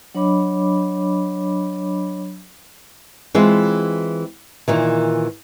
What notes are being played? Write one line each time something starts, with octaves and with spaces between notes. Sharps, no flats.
F#3 D4 C#5 D#5 B5 D6
E3 G#3 C4 F4
A#2 D#3 E3